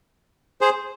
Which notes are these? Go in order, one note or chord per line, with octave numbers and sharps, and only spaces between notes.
G#4 C5